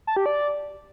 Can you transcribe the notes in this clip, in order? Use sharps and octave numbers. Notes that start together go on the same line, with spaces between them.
A5
G4
D5